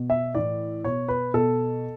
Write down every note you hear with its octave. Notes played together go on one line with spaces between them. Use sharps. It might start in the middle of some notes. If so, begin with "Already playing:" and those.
Already playing: B2
E5
A2 E3 D5
B2 C#5
B4
B2 A4